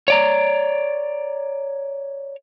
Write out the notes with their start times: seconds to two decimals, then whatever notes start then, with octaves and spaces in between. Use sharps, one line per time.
0.08 C#5 D5 A#5